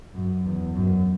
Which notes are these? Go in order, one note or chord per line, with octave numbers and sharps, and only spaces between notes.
F#2
E2
F#2